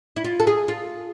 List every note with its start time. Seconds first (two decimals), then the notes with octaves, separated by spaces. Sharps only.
0.16 E4
0.24 F4
0.40 A4
0.47 G#4
0.68 F4